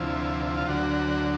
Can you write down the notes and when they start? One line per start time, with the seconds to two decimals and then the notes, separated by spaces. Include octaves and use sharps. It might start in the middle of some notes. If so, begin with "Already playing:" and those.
Already playing: D2 C3 F3 E4
0.47 E4
0.57 F4
0.67 D2 D3 F#3 F#4